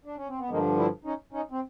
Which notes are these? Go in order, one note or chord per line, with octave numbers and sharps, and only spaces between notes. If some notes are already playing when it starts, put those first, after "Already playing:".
D4
C#4
C4
B3
G2 D3 F3 G#3 A#3
D4 E4
C#4 D#4
C#4 D#4
C4